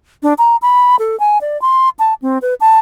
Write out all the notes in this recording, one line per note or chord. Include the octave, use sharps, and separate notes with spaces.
D4
A#5
B5
A4
G#5
D5
C6
A5
C4
B4
A5